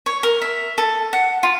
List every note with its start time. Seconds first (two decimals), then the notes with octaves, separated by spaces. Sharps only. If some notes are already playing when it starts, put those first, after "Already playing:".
0.06 C#5
0.23 A#4
0.42 E5
0.78 A4
1.13 F#5
1.43 F4